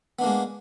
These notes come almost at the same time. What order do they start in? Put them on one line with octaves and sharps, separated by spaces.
B3 D4 A#3 G#3